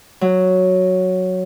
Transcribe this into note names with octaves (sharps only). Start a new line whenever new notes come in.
F#3